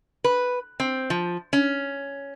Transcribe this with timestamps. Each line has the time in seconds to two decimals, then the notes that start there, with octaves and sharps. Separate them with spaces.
0.24 B4
0.80 C4
1.10 F3
1.53 C#4